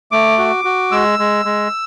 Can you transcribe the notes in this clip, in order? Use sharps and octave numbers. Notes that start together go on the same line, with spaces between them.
A3 D6
F#4
F#4
G#3 E6
G#3
G#3